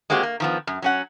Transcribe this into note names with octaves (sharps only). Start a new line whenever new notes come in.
G#3 A#3 C4 F#4 G4
A#3
D#3 F3 B3
F#2
F#3 C#4 F#5